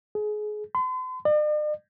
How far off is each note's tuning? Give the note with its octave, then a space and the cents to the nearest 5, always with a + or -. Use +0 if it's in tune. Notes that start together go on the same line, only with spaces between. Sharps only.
G#4 +25
C6 -45
D5 +45